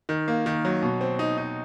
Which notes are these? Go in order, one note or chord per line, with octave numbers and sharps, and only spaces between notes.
D#3
A#3
D#3
F#3
B2
C4
D#4
D#4